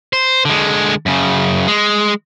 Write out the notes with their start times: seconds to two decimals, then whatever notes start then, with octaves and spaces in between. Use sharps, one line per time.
0.13 C5
0.45 D3 G#3
1.06 F#2 C#3
1.68 G#3